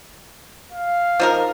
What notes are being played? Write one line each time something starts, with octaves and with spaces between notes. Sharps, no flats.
F5
F3 D#4 A#4